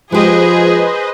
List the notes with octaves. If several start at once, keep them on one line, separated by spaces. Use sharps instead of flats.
F3 G#3 G4 G#4 B4 C5 D#5